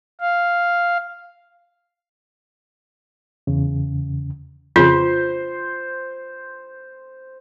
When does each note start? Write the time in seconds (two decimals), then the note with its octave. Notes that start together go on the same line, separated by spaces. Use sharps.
0.20 F5
3.47 E2 C#3
4.76 F2 C#3 F4 C5